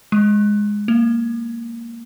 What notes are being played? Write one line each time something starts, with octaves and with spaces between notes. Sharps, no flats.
G#3
A#3